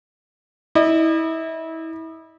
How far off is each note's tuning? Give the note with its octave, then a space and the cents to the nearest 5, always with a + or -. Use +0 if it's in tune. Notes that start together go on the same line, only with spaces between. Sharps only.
E4 -30 D#5 -45